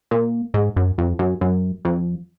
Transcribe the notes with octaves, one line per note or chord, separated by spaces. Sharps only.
A#2
G#2
F#2
F2
F#2
F#2
F2